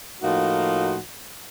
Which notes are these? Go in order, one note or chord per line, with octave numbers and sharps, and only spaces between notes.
A2 F3 A#3 D#4 F#4